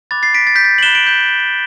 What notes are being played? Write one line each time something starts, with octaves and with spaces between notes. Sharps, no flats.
B5 D6 F#6 A6
A6 C7
B6 D7
A6
G6 B6
A6
F#7
B5 F#6 E7 G7
D7 F#7
G6